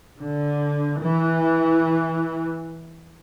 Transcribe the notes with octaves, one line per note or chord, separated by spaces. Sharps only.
D3
E3